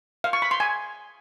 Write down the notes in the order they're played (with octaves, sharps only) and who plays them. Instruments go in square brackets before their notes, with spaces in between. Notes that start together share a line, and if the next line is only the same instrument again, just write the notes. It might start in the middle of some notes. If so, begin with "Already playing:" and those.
[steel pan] F5
C#6
B5
C6
G#5